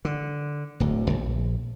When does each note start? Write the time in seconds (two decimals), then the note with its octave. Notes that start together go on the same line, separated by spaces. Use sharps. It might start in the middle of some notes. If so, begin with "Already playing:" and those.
0.05 D3
0.80 D1 D2
1.10 A#1